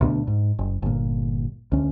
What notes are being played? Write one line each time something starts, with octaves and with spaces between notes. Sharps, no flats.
D2 B2 D4
G#2
F#1
G1 A#2
D2 C#4